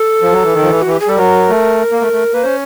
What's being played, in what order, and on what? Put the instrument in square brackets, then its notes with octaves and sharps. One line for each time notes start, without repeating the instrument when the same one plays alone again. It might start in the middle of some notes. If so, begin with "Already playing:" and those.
Already playing: [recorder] A4
[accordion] F3
F#3
E3
D#3
F3
E3
[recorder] F#4
[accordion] E3
[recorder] G4
G#4
[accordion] G3 [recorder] A4
[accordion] F#3 [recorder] A#4
[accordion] A3
A#3
A3
A3
[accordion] A#3 [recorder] B4
[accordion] C#4 [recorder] C5